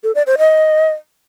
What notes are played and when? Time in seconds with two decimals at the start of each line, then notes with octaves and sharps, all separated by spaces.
0.04 A4
0.15 D5
0.27 C5
0.38 D#5